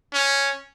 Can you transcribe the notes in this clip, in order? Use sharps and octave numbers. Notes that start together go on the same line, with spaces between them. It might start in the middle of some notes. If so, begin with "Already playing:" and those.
C#4